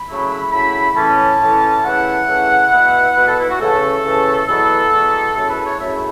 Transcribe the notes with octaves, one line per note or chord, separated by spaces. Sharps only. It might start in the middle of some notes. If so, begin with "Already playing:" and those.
Already playing: B5
C#3 F#3 A3 E4
C#3 F#3 A3 E4 B5
A2 E3 C#4 A5
A2 E3 C#4
C#3 E3 A3 E4 F#5
C#3 E3 A3 E4
B2 B3 E4
B2 B3 E4 B4
A4
E4
F#4
C#3 E3 A3 C#4 A4
C#3 E3 A3 C#4
E2 B2 F#3 B3 E4 A4
E2 B2 F#3 B3 E4
F#2 C#3 A3 E4 A4
B4
C#5
F#2 C#3 A3 E4 E5